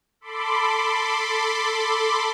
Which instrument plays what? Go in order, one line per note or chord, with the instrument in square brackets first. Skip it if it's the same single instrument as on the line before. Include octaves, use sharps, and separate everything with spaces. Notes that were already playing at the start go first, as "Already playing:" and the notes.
[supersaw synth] A4 B5 C6 D6